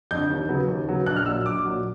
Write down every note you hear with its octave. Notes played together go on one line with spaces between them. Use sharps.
F2 D3 G6
D#2
C#3 F#3 B3
D#2
C#3 F#3 B3
A#1 F#6
F6
A#2 F#3 E6
A#1 D6
A#2 F#3